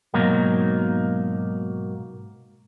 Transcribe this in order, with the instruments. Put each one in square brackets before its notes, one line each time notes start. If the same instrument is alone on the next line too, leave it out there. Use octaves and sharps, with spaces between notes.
[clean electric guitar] G#2 B2 F#3 A#3 D#4